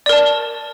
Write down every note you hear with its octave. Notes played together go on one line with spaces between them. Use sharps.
A#4 D5 A5